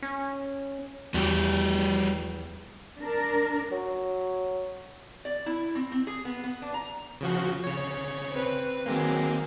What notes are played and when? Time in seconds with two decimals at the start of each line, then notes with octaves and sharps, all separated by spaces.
0.02 C#4
1.14 E2 G3 F#4 G4
2.98 D4 A#4
3.72 F#3
5.25 D5
5.46 E4
5.75 C4
5.92 C4
6.07 G#4
6.25 B3
6.44 B3
6.62 D4
6.74 A#5
7.21 C#3 F3 F#4
7.64 C#3 C#5
8.30 C4 B4
8.86 D#3 F#3 G#3 A#3 C4